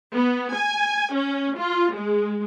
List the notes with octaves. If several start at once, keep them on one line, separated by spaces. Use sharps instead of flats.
B3
G#5
C#4
F4
G#3